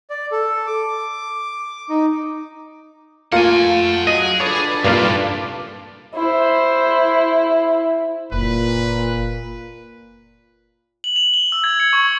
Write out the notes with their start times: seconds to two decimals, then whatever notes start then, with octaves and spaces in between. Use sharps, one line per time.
0.10 D5
0.32 A4
0.67 D6
1.90 D#4
3.32 A3 A#3 F4 F#5 G#5
4.07 F#3 G#4 D#5
4.40 D4 A4 B4 C#5
4.85 C2 G2 A#2 A#3 F4
6.15 E4 C5
8.32 F#1 A#2 B4
11.04 F#7
11.16 F7
11.34 G7
11.52 E6
11.64 G#6
11.80 C#7
11.93 C#6